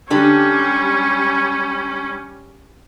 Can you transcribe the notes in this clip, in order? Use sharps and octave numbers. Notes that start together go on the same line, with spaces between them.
D3 G3 C#4 D4 G4